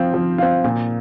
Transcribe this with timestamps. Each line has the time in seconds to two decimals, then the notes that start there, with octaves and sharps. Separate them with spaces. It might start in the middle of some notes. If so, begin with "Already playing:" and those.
Already playing: F3 C4 F4
0.14 F3
0.38 C4 F4
0.64 A#2